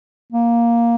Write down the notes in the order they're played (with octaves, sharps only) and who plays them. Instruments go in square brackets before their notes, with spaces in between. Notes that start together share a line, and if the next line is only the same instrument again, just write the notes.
[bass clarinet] A#3